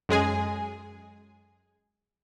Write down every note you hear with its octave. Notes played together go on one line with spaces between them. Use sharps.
F#2 G#3 G#4 G#5